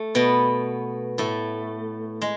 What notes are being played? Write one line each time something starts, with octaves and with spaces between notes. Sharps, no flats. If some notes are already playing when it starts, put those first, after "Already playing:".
Already playing: A3
B2 B3
A2 A3
G#3